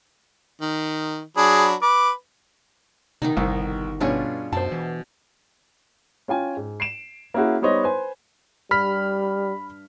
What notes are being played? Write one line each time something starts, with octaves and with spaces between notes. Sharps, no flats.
D#3
F#3 D4 G#4 B5
B4 D6
C3 D#3 B3 D#4
G1 C2 D#3
G2 B2 C#4 D4 F4 G#4
F#2 B2 C5 A5
E3
C#4 F4 G5 G#5
G#2
C7 D7 E7
A#3 C#4 E4 F#4 G#4
G3 B3 D#4 C5 C#5 D#5
B4 C5 G#5
G2 G3 B5 F6 B6